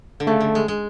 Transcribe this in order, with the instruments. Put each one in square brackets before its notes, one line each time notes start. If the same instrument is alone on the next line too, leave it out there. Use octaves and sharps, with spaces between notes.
[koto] D3
[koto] C#3 [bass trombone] A3
[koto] D3
G#3
G#3